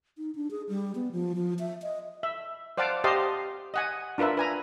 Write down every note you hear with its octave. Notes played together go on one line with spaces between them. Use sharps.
D#4
D4
G#4
G3
B3
F3
F3
E5
D#5
E5
C5 D5 F5 F#5 A5 D6
G4 C5 D#5 F5 A5 C6
D#5 F#5 G#5
D4 F4 A#4 B4 E5
B4 G#5 A#5